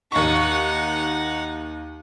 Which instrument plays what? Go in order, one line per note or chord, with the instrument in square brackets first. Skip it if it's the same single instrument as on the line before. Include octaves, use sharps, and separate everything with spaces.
[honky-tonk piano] D#2 C#6 [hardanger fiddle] D#4 F#5